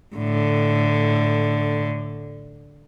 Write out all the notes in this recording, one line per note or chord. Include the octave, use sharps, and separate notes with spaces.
A2 D3